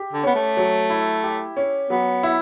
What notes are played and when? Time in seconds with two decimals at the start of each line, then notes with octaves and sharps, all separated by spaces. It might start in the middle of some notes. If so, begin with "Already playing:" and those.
Already playing: G4
0.13 D3
0.23 B3 C#4
0.35 A3
0.57 F#3
0.90 E4
1.23 G4
1.57 C#4
1.90 F#3 B3
2.23 E4